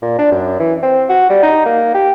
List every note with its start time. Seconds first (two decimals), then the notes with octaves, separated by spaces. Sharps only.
0.02 A#2
0.19 D4
0.32 F#2
0.60 E3
0.83 C4
1.09 F#4
1.30 G3
1.43 D#4
1.66 A#3
1.94 G4